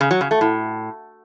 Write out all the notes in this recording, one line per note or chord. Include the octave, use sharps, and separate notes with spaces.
C#3
F#3
C#3
A3
A2